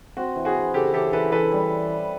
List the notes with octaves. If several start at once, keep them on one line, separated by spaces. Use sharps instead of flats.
C4 F#4
E3
F#4 G#4
C4
C#3 G4 A4
E3 G4 A4
E3 A4 B4
E3 A4 B4
G3